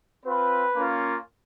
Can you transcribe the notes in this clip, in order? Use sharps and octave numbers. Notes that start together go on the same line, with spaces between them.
C4 F4 B4
A#3 C#4 F4